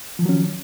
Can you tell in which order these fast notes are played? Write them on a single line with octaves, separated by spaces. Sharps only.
F3 D#3 F#3 C#4